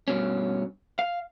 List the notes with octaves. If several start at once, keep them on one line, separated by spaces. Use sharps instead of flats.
G2 B2 C#4
F5